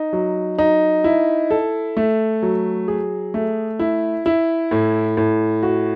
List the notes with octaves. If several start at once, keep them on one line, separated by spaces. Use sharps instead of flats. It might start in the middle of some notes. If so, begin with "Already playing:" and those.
Already playing: D#4
F#3
D#4
E4
A4
A3
F#3
G#4
A3
E4
E4
A2
A2
F#4